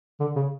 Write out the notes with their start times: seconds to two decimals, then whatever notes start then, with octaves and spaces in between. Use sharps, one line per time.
0.20 D3
0.36 C#3